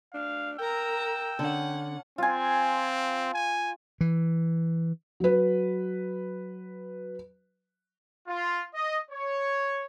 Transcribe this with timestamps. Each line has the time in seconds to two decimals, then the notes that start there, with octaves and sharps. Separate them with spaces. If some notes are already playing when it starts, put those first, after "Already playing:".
0.14 D4 F5
0.59 A#4 G5 A#5 E6
1.39 D3 C#4 F#5
2.18 C4 F4 G#5
3.34 G#5
4.01 E3
5.20 F#3 B4
8.27 F4
8.74 D#5
9.09 C#5